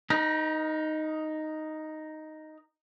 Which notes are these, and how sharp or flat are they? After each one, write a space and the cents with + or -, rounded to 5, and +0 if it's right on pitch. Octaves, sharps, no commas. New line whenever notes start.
D#4 +0 A#4 +45